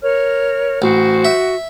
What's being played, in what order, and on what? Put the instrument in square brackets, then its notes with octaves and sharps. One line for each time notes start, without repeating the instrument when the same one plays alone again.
[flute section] A#4 C#5 F6
[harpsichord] A1 [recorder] F#4 [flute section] C5
[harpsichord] E5